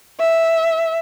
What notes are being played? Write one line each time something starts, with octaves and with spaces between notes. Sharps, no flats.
E5